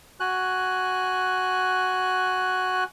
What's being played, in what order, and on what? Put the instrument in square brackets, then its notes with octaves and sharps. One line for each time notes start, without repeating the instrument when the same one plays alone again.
[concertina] F#4 G#5 F#6